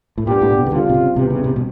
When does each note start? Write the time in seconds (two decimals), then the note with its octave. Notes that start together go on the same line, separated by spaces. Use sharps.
0.18 A2
0.27 A#2 G3 B3 D4 G4
0.42 A2
0.50 A#2
0.57 B2
0.66 C#3
0.72 D3 G3 C4 F4
0.89 C3
0.94 C#3
1.16 G2 C3 E3 G3 B3
1.30 C#3
1.44 C3
1.56 B2